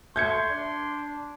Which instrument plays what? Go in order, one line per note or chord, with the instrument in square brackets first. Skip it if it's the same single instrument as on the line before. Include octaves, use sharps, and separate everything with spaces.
[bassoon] A3 [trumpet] C6 [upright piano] G6 G#6 C#7
[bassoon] D4